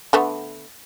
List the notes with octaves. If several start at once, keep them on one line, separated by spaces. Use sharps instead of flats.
D3 A3 B3